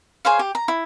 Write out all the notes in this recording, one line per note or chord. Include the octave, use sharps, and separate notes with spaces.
G#4 C5 C#5 F5
G4
A#5
E4